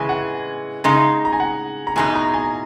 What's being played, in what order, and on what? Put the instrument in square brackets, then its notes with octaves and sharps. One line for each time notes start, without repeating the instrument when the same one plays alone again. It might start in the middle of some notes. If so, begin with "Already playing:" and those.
Already playing: [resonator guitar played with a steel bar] C#3 E3 G#3 [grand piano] G#5
[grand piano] F#5
[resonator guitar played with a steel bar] C#3 G#3 D#4 [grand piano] G#5
[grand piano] A#5
G#5
F#5
A#5
[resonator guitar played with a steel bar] E2 B2 G#3 D#4 [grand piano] G#5
[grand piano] A#5
G#5